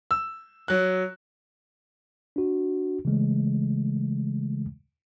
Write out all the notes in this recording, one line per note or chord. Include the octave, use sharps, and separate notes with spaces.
E6
F#3 F#6
D4 F#4
C#3 E3 G#3 A3